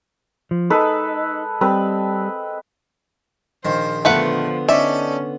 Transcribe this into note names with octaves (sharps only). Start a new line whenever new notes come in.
F3
G#3 D#4 A4 B4
G3 C4 B4
A#1 D#3 C5
D3 F3 A3 B3 B4 F#5
C#4 D#4 A4 D5 E5